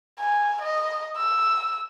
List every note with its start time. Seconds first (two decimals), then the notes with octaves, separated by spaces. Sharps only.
0.20 G#5
0.62 D#5
1.17 E6